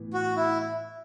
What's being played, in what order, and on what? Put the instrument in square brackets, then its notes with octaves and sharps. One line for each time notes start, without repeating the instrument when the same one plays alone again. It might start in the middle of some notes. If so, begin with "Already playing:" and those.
Already playing: [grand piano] A2 E3 B3
[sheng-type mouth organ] F#4
E4